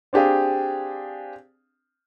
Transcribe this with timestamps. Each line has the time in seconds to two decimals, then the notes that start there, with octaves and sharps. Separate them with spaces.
0.13 C4 D4 G4 G#4 F5